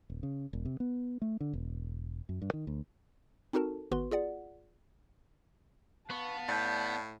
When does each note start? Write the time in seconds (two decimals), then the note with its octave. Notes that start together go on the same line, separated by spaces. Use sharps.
0.10 D#1
0.23 C#3
0.53 E1
0.65 C3
0.80 B3
1.22 A3
1.41 D3
1.53 E1
2.29 F#2
2.42 G2
2.53 D#3
2.67 D2
3.53 C4 D#4 F#4 A4 A#4 A5
3.92 G#1 B3 F#4 B4 C6
4.11 F4 G#4 D5 F#5
6.10 B3 B4 F5 A5 B5 C#6
6.49 A2 D5 G6